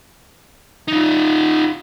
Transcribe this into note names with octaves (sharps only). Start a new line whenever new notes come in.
D#4 F4